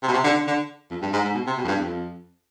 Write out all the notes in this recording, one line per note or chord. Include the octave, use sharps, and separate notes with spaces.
C3
B2
C3
D3
D3
D3
F2
G2
G#2
G#2
B2
C3
B2
F2
G2
F2